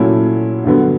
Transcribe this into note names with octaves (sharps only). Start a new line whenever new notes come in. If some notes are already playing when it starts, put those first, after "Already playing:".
Already playing: A#2 F#3 A3 C#4 E4
G2 D3 F#3 B3